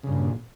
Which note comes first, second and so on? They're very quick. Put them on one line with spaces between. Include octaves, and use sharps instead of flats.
C#3 G2 A#2